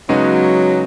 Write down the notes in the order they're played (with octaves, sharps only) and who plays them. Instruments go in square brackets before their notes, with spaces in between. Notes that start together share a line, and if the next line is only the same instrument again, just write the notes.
[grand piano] C#3 G#3 B3 D#4 F#4 [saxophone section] F#3